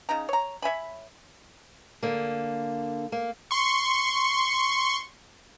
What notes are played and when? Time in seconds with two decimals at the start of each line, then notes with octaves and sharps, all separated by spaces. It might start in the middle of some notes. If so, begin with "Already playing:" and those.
0.09 C#3 D#4 A#5
0.29 C#5 A#5
0.62 C#5 E5 G#5 B5
2.03 D3 A#3
3.12 A#3
3.51 C6 C#6